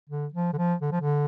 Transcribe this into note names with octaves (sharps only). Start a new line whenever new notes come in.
D3
F3
D3
F3
D3
F3
D3